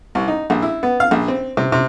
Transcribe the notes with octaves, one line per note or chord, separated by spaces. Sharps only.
C2
D#4
A#1
E4
B3
F5
A#1
C4
C3
C3